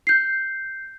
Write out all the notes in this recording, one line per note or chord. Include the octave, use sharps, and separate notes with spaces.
G6 C7